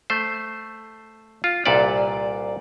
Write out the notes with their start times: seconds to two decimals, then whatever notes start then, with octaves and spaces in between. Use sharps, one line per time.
0.10 A3 C5
1.44 F4
1.66 C2 A#2 A4 B4 D5